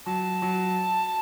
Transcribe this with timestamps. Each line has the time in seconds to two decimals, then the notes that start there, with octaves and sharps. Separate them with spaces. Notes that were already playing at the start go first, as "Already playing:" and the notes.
0.06 F#3 A5
0.42 F#3